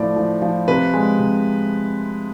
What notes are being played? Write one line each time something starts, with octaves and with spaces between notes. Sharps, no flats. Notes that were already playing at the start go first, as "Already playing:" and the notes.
Already playing: A2 F3 D5
F3
F3
C3 B4
G#3
C3